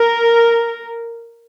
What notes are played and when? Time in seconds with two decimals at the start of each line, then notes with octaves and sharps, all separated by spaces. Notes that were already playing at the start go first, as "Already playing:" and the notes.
Already playing: A#4